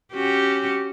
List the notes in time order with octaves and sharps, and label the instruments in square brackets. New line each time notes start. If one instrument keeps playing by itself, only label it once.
[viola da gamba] C#4 F#4 G4